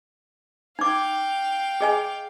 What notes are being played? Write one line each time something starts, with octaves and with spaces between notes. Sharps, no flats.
D#4 F5 G5 D6
G#4 D#5 G#5